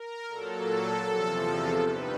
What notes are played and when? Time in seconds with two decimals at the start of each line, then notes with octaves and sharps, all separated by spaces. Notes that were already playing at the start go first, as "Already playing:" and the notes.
Already playing: A#4
0.28 A#2 F#3 A4
1.08 E2 C3 F3
1.86 G2 D#3 G3 B4